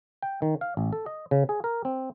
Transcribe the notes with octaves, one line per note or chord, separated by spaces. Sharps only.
G5
D#3
F5
A1
A4
D#5
C#3
G#4
A#4
C4